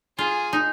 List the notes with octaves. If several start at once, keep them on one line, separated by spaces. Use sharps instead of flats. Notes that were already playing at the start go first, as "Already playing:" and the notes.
F4 G#4
D#4